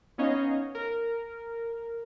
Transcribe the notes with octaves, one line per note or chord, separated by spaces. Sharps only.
B3 C#4 D#4 C#5 D#5 F5
A#4